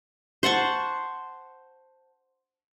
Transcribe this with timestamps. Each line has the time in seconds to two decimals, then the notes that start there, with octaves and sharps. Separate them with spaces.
0.43 C5 F#5 A5 C#6